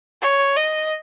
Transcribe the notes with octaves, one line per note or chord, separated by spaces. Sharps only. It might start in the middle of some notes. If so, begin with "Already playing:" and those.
C#5
D#5